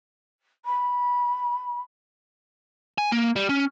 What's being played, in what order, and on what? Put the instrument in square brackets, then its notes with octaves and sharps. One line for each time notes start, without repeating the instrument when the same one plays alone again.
[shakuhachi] B5
[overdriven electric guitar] G#5
A#3
G3
C#4